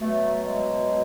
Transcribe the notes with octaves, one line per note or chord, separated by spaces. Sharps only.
B2 F#3 A3
G#3